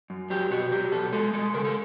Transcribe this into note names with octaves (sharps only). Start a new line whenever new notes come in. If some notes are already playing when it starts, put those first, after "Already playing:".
F#2
F#3 G4
B2 F#4
F#3 G4
B2 A4
G#3 A4
G#3 A4
C#3 A#4
A4